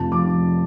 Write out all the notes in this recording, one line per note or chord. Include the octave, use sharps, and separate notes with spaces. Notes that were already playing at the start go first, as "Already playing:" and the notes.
Already playing: F1 F2 F3 A5
F3 D6